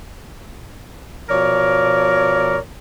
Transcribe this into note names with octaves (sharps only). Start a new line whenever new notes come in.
B2 F3 A#4 C#5 D5